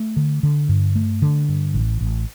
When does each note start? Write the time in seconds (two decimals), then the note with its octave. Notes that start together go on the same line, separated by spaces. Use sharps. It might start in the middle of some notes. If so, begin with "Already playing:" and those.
Already playing: A3
0.16 D3
0.43 D3
0.69 G2
0.95 A3
1.22 D3
1.49 G2
1.74 A1
2.01 A1